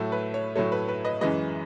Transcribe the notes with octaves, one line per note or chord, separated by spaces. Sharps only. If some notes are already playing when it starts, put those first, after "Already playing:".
Already playing: A2 F#3 A3 C#5
B4
C#5
A2 F#3 A3 C#5
B4
B4
B4 D#5
F#2 E3 G#3 B4 D#5